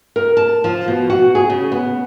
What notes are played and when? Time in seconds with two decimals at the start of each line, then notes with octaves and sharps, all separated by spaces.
0.16 A#4
0.37 A5
0.64 F3
0.88 B2
1.10 F#4
1.35 G#4
1.50 C#3
1.72 B3